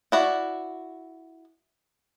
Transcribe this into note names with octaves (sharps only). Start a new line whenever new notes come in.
E4 F#4 D5